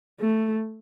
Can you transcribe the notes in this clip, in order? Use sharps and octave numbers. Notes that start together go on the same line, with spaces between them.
A3